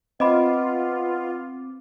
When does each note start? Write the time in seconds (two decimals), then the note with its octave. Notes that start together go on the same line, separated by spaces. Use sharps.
0.20 B3 C4 F4 D#5 B5 D6